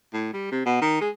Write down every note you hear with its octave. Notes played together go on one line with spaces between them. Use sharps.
A2
G3
C3
B2
D#3
G#3